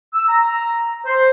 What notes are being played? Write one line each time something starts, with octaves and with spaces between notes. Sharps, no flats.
E6
A#5
C5